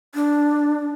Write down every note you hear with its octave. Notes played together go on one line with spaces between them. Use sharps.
D4